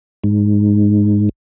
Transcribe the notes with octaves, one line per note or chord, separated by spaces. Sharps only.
G#2